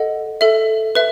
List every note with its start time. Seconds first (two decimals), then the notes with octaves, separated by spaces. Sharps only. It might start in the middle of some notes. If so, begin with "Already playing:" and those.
Already playing: A4 D#5 F#5
0.41 A4 E5
0.95 B4 E5